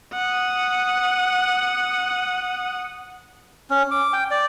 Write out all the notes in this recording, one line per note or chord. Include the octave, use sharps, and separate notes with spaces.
F#5 D#6
C#4
D6
G5
D5